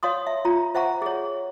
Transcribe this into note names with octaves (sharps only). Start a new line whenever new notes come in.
C#5 F5 C6 D#6
E5
F4 A#5
C5 E5 F#5 A#5 C#6
G#4 C#5